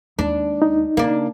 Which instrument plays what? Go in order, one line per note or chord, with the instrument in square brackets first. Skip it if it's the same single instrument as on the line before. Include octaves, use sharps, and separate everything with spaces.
[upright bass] D#2 G#3 [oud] D4
[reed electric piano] D#4
[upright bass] C#3 [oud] A#3 D4